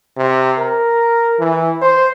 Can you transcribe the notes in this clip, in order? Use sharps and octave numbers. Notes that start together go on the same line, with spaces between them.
C3
A#4
E3
C5